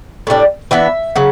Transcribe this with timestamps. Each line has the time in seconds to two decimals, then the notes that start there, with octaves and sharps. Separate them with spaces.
0.27 A2 G3 D4
0.71 E3 B3 D4 E5
1.16 C#3 F#3